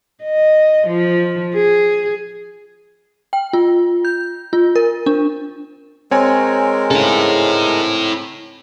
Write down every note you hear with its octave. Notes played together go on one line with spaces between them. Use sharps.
D#5
F3
G#4
G5
F4
G6
F4
A#4
D4
G#3 C4 A#4 C#5 G#5
G#2 C#3 E4 A4